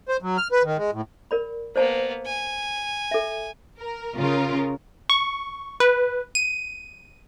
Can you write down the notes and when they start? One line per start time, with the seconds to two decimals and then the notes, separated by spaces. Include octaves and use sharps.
0.09 C5
0.22 F#3
0.37 F6
0.52 B4
0.64 D#3
0.77 G#3
0.93 A2
1.31 A#4 D5 B5
1.76 A#3 B3 C5 D5 A5
2.26 G#5
3.11 A4 E5
3.78 A#4
4.18 C#3 F4 A#4
5.10 C#6
5.80 B4
6.35 D#7